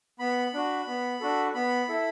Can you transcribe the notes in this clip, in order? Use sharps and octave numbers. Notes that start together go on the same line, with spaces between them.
B3 B5
D4 F#4
B3
D4 F#4 A4
B3 B5
E4 A4